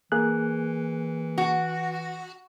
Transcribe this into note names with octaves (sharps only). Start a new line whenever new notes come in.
E3 A#3 G#4 F#6
F#4